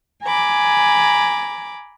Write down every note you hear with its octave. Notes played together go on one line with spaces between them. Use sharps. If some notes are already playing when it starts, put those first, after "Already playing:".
G#5 A#5 B5 D6